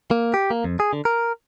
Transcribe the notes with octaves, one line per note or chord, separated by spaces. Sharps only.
A#3
G4
A#3
F2
G#4
D3
A#4